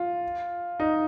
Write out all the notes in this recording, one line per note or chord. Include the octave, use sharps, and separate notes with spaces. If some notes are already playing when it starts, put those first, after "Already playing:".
Already playing: F4
D#4